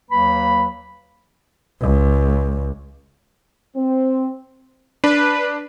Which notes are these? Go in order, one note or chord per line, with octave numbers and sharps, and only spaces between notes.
D#2 F#3 A#3 B4 B5
C#2
C4
D4 B4